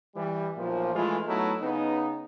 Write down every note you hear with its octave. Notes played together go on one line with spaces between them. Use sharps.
E3 G3
B1 A#2 F3
E3 G#3 A3 E4 F4
F#3 A3 B3 D#4 E4
C#3 B3 D#4